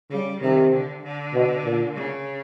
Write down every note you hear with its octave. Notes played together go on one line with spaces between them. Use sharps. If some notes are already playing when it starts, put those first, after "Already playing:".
C#3 G3
C3 D#3
D3
D3
B2
A#2
C#3